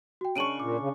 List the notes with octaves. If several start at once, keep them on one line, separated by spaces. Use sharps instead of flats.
F#4 G5
C#3 D4 C#6 D7 D#7 F#7
A#2 D6
C#3